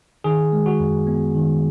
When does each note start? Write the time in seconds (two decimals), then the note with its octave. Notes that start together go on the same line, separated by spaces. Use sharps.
0.24 D#3 G#4
0.52 G#3
0.66 F#4
0.80 F#2
1.07 B3
1.35 D#3